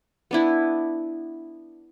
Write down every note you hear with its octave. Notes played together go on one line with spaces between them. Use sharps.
B3 D4 E4